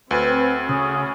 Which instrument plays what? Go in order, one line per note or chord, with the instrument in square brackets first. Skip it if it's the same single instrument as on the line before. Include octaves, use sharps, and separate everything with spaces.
[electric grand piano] D2 [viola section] C4 [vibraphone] B4
[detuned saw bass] C#3 [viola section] C#4 [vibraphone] D#6